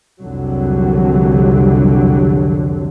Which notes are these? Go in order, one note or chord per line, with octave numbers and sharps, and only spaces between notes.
C2 F2 D3 F#3